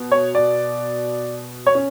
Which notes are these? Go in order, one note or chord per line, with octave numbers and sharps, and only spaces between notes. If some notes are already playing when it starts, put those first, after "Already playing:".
Already playing: B2
C#5
D5
C#5
C#4